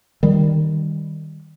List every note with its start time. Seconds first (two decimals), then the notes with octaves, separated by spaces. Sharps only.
0.23 D#3 G3